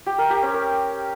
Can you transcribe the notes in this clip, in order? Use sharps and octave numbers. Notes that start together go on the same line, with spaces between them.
G4
A#4
G4
C#4
A#4